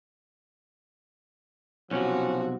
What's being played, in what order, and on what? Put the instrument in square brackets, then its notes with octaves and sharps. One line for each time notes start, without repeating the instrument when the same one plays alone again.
[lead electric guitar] B1 C3 [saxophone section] E3 C#4 [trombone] F3 [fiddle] F#4